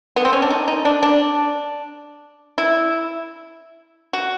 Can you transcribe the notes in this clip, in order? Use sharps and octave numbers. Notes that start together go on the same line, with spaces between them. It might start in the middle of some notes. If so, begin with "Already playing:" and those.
B3
C4
C#4
D4
D#4
D#4
D4
D4
E4
F#4